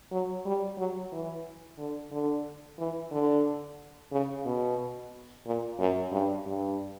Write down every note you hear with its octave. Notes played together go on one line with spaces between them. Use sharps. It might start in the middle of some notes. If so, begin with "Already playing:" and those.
F#3
G3
F#3
E3
D3
D3
E3
D3
C#3
B2
A#2
F#2
G2
G2